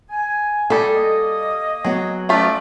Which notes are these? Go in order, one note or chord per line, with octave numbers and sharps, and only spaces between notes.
G#5
G3 G#4 A4
A#3 D#5
F#3 B3 G#4
F3 A3 C#4 F4 D5